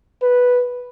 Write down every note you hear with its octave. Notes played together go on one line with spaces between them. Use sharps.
B4